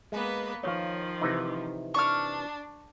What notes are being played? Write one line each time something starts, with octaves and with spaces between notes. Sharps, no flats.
G#3 A#3 B3 B4
D#3 F3 C#5 F5
C3 E3 D#4
D4 C#6 F6